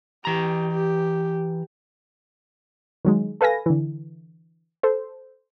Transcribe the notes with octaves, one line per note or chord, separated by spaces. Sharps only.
E3 G4 A#5
G4
D#3 F#3 G#3
A4 B4 F5 G#5 A#6
D3 E3
A4 C5